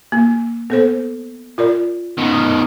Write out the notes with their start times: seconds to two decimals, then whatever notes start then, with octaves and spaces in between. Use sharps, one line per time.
0.12 A#3
0.70 B3 A4 C5
1.58 F4 A#4 D5
2.18 B2 D#3